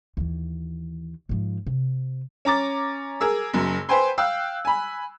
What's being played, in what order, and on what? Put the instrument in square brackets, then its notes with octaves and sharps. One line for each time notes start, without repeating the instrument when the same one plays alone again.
[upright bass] D#2 E3
G#2 F3
C3
[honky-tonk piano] C#4 A#5 D6 A6
G#4 A#4 E6
F#1 F#2
B4 C5 G5 G#5 C6
F5 G5 E6 F#6
G#5 B5